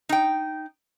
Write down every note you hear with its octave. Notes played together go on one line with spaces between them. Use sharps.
D#4 G5